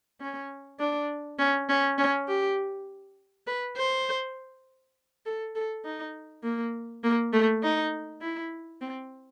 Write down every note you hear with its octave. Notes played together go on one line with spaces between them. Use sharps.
C#4
D4
C#4
C#4
C#4
G4
B4
C5
A4
A4
D#4
A#3
A#3
A3
D#4
E4
C4